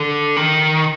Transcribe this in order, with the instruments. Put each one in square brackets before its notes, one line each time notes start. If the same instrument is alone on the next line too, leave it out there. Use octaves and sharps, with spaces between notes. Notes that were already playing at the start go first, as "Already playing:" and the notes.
Already playing: [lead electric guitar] D3
D#3